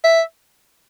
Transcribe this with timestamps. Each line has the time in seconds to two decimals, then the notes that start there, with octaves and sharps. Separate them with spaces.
0.04 E5